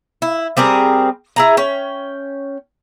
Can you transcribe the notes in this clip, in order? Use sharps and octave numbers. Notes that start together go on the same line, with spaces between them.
E4
G3 C4 G#4 A#4
E4 G#4 A#5
C#4 G5